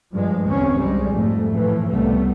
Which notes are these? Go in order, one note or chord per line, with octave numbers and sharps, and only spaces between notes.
G2 F3 G#3
G1 E2 G2 C4 C#4
C2 G3 G#3
F2 G#2 A3
A2 E3 F3
C2 A2 G3 A3 B3